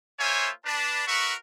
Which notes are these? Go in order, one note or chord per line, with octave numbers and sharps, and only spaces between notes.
A#3 F4 C5 C#5 E5 G#5
D4 B4 A5
F#4 A#4 B4 E5 C#6